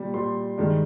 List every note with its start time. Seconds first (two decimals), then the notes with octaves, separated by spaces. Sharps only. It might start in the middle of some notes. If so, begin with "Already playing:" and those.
Already playing: A#2 G3
0.14 A#2 G3 C6
0.58 G2 D#3 G#3